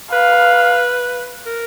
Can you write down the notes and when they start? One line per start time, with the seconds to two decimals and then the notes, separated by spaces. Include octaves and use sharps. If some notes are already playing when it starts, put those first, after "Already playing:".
0.12 B4 F5
1.46 A#4